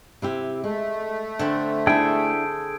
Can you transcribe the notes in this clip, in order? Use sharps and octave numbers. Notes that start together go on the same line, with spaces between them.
C3 E4 G4
G#3 A3
D3 C4 D4 B5
D4 E4 G#4 A4 G5